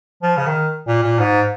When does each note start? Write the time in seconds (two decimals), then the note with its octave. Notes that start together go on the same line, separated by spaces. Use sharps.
0.22 F3
0.37 C#3
0.46 D#3
0.87 A#2
1.03 A#2
1.19 G#2